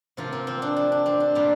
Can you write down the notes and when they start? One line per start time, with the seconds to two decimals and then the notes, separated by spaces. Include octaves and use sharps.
0.17 C3 F3 A#3 F4
0.33 C4
0.47 C4
0.62 D4
0.76 D4
0.92 D4
1.06 C4
1.20 D4
1.35 A#2 G3 A#3 F4